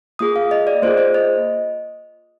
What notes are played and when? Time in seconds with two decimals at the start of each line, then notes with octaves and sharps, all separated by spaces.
0.19 A#3 F4 G#4 D#6
0.36 F5
0.51 D#5
0.67 D5
0.82 A#3 F4 G#4 C5
0.98 C5
1.14 D#5